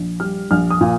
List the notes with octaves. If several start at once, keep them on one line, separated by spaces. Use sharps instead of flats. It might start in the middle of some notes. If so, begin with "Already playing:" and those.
Already playing: A#1
G3 F6
A#1 F6
D#6
A#2